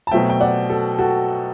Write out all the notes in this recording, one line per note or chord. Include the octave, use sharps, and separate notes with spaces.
A5
B2 F#3 A3 C4 E5 G5
G5
D5 F#5
F#4 A4
F#4 A4